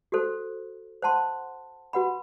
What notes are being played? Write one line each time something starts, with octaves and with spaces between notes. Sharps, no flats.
F#4 A4 C5
C5 F#5 A5 C6
F#4 B4 F#5 B5